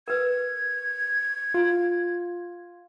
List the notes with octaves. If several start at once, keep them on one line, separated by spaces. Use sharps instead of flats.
A#4 B4 G#6
F4